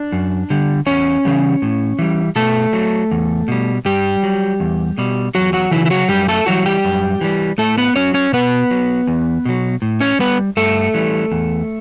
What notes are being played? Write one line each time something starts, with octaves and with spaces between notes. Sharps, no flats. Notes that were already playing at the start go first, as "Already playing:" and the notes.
Already playing: D4
F#2
D3 G3
E2 C#4 C#5
C#3 E3 G3
A2
E3 G3
B2 A3 A4
F#3
E2
B2 G3
G2 G3 G4
F#3
E2
B2 G3
E2 F#3 F#4
F#3 F#4
C#3 E3 F#3 E4
E4
F#3 F#4
F#2 G3 G4
A3 A4
E3 F#3 G3 F#4
G3 G4
F#2
E3 G3
A2 A3 A4
B3 B4
F#3 C#4 C#5
C#4 C#5
B2 B3 B4
F#3
E2
B2 F#3
A2
C#4 C#5
G3 B3 B4
G2 A3 A4
E3 G3
E2